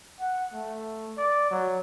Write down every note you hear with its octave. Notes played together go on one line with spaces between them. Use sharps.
F#5
A3
D5
F#3